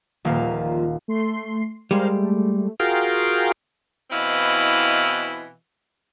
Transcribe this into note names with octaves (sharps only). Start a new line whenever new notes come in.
D#1 A#2 F3 G3 F5
A3 C6 C7
G3 G#3 A#4 C5 F5
A3
F4 F#4 G#4 A#4 F5 G5
B2 E3 C4 E4 D#5 F5